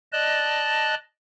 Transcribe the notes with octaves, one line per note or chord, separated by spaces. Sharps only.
D5 D#5 A5 F#6